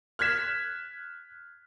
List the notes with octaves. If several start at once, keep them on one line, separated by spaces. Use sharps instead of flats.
F6 F#6 G#6 B6 E7